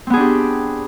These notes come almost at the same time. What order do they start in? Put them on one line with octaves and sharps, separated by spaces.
C4 B3 G#4 D4 G4